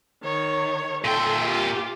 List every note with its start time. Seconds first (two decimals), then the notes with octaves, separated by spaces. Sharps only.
0.24 D#3 C#5
1.04 A#2 A4 E5 G5 C6
1.48 F4 G4